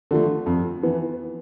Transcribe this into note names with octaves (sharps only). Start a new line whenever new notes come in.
D3 F3 A3
F2
E3 B3